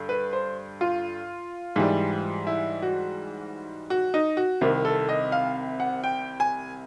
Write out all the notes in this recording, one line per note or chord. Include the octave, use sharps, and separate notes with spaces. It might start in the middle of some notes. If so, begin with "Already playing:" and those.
Already playing: G2 D3
B4
C5
F4
G#2 E3 G3
E4
F#4
F#4
D#4
F#4
C2 C3 D#3
A4
D#5
F5
F#5
G5
G#5